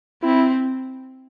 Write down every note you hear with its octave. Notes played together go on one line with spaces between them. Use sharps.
C4 E4